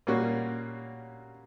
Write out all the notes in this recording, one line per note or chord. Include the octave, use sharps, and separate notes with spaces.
A#2 G3 A#3 C#4 F#4